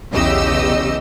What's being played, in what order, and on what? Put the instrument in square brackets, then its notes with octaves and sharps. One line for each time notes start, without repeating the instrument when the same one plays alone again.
[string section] B1 E2 C#3 G4 D#5 E6